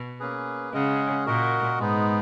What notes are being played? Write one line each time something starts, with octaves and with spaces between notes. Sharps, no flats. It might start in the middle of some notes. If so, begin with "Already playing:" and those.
Already playing: B2
A#3 C#4 G#4 B4
C#3 G#3 C#4 G#4 D#5 F#5
A#2 F#4 A#4 D#5 F#5
G#2 G#3 B3 D#4